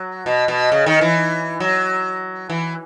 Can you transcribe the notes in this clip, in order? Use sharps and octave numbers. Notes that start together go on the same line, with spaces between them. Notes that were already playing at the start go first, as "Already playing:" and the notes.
Already playing: F#3
B2
B2
C#3
D#3
E3
F#3
E3